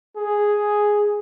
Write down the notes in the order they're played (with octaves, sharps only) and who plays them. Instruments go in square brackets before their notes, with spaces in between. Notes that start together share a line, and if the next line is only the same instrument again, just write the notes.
[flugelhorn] G#4